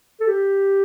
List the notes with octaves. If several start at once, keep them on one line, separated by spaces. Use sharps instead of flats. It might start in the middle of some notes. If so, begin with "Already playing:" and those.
A4
G4